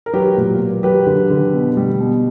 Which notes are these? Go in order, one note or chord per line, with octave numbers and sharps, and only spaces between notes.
A#4
F#3 G4 B4
A#2
A#2
F#3 G4 B4
D3
D3
B2
G3
B2